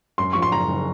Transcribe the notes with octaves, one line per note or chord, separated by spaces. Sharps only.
F#2 C6
F3 C#6
C6
F#1 A#5
F#1